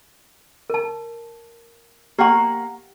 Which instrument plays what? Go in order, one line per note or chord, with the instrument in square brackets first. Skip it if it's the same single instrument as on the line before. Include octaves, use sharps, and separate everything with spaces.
[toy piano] A#4 A5
[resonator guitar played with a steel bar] A#3 F#5 [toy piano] G4 G5 C#6